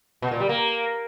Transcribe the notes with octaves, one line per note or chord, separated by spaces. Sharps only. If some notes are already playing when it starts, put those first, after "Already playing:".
B2
A#2
G3
A#3